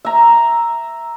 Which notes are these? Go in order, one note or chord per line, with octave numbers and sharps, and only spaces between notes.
E5 A#5